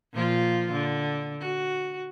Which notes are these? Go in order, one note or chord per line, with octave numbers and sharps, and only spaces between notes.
A#2 F3 F4
D3
F#4